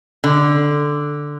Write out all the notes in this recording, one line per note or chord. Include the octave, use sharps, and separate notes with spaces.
D3